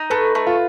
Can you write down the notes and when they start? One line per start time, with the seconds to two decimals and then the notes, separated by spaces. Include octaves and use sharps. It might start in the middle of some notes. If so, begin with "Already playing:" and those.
Already playing: D#4
0.10 A3 B4
0.35 A3
0.47 F4